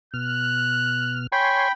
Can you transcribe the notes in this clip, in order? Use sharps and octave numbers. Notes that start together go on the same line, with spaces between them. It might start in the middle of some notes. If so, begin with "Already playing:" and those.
B2 F6 F#6
C#5 G5 G#5 B5 C6